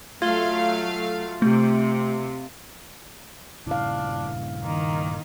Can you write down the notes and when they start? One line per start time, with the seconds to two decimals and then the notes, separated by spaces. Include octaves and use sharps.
0.22 F#3 A3 F4 F5 G#6 G7
1.42 C3 A3
3.67 G2 A#2 C#3 D4 E4 F5
4.64 D#3 A#3